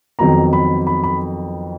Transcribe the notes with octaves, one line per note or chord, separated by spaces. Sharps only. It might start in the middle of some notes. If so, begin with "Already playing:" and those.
F2 D#3 F#3 B3 A#5
B5
B5
B5